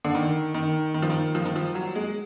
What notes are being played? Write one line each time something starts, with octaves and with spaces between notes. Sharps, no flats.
D3
D#3
D#3
D#3
F3
D#3
F3
D#3
F3
F#3
G#3